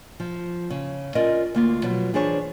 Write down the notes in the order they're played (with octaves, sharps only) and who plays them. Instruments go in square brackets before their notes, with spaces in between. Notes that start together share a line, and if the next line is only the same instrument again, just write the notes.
[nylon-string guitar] F3
C#3
C#4 F4 A#4 D5 D#5
D2 A#3 F4
B2 F3 F#3
E3 D4 F4 G#4 C5 C#5